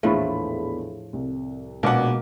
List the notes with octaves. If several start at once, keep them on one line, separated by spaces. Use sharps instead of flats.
A#1 E2 A2 F3 A3 B5
C2
A#1 B2 G#3 A#3 F#5 D6